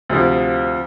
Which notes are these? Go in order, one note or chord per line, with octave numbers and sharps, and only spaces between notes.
D2 C3 F3